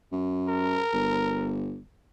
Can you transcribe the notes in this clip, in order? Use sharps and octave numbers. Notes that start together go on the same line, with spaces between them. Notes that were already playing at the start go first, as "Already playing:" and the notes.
F#2
A#4
G1